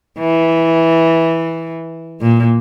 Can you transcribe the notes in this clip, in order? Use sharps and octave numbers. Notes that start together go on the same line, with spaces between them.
E3
A#2